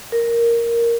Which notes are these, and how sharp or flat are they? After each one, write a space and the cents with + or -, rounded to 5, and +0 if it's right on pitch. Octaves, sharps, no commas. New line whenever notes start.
A#4 +0